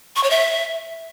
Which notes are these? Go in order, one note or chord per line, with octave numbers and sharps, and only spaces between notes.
C#6
C#5
E5